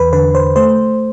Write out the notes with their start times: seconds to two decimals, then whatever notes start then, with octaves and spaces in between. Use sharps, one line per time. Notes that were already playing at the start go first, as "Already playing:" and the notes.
Already playing: E2 B4
0.13 D3 B4
0.35 C5
0.56 A3 C5